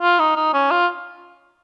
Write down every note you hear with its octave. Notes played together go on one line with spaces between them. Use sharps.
F4
D#4
D#4
C#4
F4